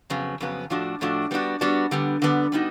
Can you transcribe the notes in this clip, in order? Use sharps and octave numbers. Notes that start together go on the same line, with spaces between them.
F2 C#3 F#3 B3
F2 C#3 F#3 B3
A2 F3 A3 D4 F#4
A2 F3 A3 D4 F#4
G3 B3 D4 F#4
G3 B3 D4 F#4
D3 G3 B3
D3 G3 B3
G3 B3 D#4 F#4